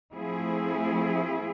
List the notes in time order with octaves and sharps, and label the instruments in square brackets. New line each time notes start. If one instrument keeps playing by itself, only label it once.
[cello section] F3 A3 C4 E4 G#4